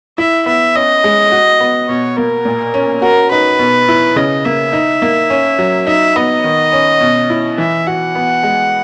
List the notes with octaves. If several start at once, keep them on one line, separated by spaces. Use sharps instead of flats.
E4 E5
B3 E5
C#4 D#5
G#3
F#4
B3
B2 C#5
A#3 A#4
A#2
C#4
F#4 A#4
D#4 B4
B2
E4
C#3 D#5
A#3 E5
D#4
A#3
C#4
F#3
D#4 E5
B3 D#5
D#3
C#4
B2
E4
E3 E5
F#4 F#5
B3
G#3